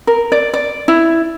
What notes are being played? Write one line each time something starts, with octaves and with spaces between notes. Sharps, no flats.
A#4
D5
D5
E4